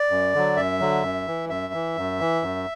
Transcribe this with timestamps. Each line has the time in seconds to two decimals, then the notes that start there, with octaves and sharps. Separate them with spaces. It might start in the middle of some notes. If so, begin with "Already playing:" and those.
Already playing: D5
0.10 F#2
0.34 D3 F#3
0.56 F#2 E5
0.80 D3 F#3
1.03 F#2
1.27 E3
1.49 F#2 E5
1.74 E3
1.97 F#2
2.20 E3
2.43 F#2